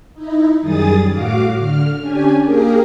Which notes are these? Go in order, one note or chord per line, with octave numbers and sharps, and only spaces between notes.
D#4 E4
F#2 D#3 G3 G#4 D#6 A6
A2 F#4 F5 D6
D3 F6
C#4 D4 G4 G#5
A#3 G4 G#4 A#4